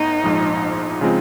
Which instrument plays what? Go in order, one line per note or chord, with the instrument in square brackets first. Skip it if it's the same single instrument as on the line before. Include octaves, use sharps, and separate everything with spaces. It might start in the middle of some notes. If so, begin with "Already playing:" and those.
Already playing: [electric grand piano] A2 B3 [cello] D#4
[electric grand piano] A#1 G#2 F3
C#3 F3 G#3 C4 F4